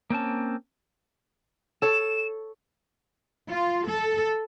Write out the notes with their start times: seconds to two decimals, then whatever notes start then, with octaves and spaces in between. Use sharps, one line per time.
0.10 A#3 C4 C#4 A5
1.82 A4 C#5 E7
3.49 F4
3.87 A4